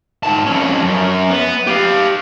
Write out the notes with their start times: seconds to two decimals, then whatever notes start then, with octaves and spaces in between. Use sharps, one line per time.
0.23 G#2 A5
0.46 F2 C#4
0.83 F#2
1.30 B3
1.67 G4 F5